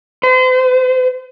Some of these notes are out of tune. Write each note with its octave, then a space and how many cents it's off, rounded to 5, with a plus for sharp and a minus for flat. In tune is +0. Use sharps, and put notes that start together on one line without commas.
C5 -40